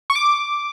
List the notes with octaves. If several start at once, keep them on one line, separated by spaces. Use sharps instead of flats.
C#6
D6